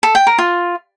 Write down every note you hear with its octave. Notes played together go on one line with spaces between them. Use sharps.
A4
G5
A#4
F4